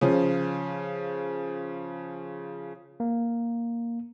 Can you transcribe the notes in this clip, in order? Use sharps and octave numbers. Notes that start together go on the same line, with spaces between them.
C#3 F3
A#3